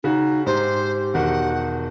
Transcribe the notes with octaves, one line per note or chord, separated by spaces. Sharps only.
C#3 D#4 F#4
G#2 G4 C5
E1 D#3 F#4 F#5